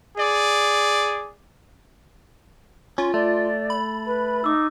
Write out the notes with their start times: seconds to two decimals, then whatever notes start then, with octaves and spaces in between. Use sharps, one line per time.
0.18 G#4 D5
2.98 C#4 F4
3.14 A3 D5 A6
3.70 B5
4.06 B4
4.44 D#4 D6 E6